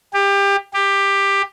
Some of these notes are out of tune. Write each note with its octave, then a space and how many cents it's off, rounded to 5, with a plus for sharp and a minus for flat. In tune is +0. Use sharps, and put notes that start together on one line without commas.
G4 +25
G4 +15